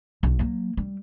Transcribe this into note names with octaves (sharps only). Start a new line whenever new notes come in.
B1
F#3 A#3
G3